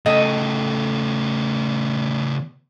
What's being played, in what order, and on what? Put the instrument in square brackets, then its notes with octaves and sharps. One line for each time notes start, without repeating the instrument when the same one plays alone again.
[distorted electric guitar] C#3 A3 [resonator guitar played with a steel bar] A4 D#5 G5